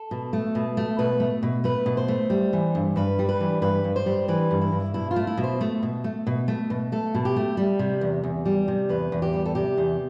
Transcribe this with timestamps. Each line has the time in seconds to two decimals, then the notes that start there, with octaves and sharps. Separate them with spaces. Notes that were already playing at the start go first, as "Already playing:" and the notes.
Already playing: A4
0.11 B2
0.33 A3
0.55 B2
0.77 A3
0.99 B2 B4
1.20 A3
1.43 B2
1.64 A3 B4
1.86 B2
1.97 C5
2.08 A3
2.30 G3
2.53 E3
2.75 G2
2.96 G2 B4
3.19 G3
3.29 B4
3.41 E3
3.62 G2 B4
3.84 G2
3.96 C5
4.06 G3
4.28 E3 B4
4.51 G2
4.61 E4
4.72 G2
4.94 B2 E4
5.11 F4
5.16 A3
5.27 E4
5.37 B2
5.44 C5
5.61 A3
5.83 B2
6.04 A3
6.27 B2
6.48 A3
6.70 B2
6.92 A3 A4
7.14 B2
7.25 G4
7.36 A3
7.57 G3
7.79 C3
8.01 E2
8.24 E2
8.45 G3
8.68 C3
8.89 E2 B4
9.12 E2
9.22 G4
9.33 G3
9.45 A4
9.55 C3 G4
9.78 E2